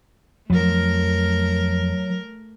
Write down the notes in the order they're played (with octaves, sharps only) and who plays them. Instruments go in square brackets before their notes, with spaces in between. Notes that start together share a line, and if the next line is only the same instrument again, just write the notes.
[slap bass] F2 F3 [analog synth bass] F#3 [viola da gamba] A3 A#4